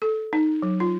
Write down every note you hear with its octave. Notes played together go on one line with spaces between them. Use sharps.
A4
D#4
F#3
F4